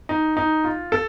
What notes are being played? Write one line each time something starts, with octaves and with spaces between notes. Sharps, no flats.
D#4
D#4
F4
A4